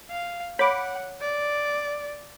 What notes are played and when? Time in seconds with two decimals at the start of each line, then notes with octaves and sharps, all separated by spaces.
0.11 F5
0.59 C#5 F#5 B5 D6
1.21 D5